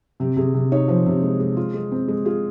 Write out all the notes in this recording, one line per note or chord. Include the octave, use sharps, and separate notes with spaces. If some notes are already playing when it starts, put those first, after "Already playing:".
C3 G4
C3 G#4
C3
D#4 C#5
F3 C5
C3
G#3
G#3
F4
G#3
C4
G#3
F4 G#4